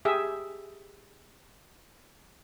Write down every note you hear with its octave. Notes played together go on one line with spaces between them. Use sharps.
G4 G#4 E5